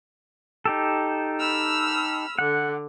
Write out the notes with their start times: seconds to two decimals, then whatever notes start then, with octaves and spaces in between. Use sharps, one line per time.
0.65 D#4 G4 A4
1.39 B5 E6 F6
2.39 D3 F#5